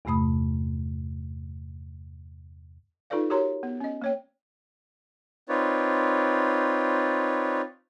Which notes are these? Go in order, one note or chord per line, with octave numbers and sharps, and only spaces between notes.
E2 G2 C3 A3 B5 D#6
D#4 F4 A4 B4 D5 F5
F#4 G4 A#4 C#5 A#5 C6
B3
C#4 D#5
A#3 C#5 G5
C4 D#4 F4 B4 C#5 D5